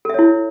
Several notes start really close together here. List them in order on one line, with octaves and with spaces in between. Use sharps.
A4 E5 C#5 E4